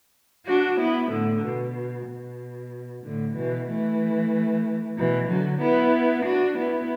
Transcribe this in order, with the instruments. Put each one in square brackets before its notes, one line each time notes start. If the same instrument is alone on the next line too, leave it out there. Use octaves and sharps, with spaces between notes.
[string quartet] D4 F#4
B3 E4
A2 D3
B2
B2
A2 D3
B2 E3
E3 A3
B2 E3
D3 F#3
B3 E4
D4 F#4
B3 E4